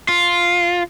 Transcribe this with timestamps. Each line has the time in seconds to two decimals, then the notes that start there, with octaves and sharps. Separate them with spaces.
0.09 F4